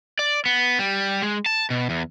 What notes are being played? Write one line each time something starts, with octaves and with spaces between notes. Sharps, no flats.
D5
B3
G3
G#3
A5
B2
E2